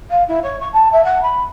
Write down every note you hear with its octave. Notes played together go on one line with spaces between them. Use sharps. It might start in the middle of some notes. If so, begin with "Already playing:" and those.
F5
E4
C#5
C#6
A5
E5
F#5
B5